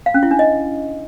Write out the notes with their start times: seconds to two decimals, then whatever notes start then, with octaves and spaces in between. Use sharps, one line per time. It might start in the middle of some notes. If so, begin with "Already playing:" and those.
0.06 F5
0.14 C#4
0.23 E4
0.31 D4
0.39 D#5